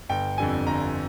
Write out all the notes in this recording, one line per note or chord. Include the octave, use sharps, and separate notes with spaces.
G1 G5
F2 D3 G3 G#5
G1 A#5